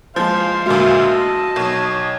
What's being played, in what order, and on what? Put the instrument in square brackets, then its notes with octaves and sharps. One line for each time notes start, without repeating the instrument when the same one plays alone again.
[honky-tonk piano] F3 G#3 [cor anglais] C5 [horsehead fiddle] F5
[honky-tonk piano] D2 A#2 G#3 [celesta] F#4 [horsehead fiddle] E5 F5
[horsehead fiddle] D#5 A5 [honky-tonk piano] E6
[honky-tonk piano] B1 [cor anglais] C#5